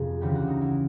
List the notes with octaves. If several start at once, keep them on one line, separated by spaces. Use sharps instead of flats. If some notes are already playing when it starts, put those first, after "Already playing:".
Already playing: G1 F2 C3 G#4
D2 C#3 E3 G3 G4
F#4
D#4
E4